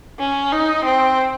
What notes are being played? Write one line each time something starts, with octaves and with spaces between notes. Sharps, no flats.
C#4
D#4
C4